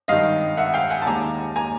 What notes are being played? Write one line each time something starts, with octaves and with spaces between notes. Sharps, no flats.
G#1 G2 D#3 D#5 F5
E5 F#5
F5 G5
F#5 G#5
A5
D#2 D#3 G#3 G#5 A#5
G#5 A#5